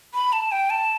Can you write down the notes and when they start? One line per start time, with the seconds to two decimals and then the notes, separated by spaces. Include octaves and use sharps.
0.14 B5
0.33 A5
0.52 G5
0.70 A5